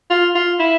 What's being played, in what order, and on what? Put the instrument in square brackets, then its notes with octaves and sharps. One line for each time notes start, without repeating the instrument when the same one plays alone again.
[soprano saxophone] F4
F4
E4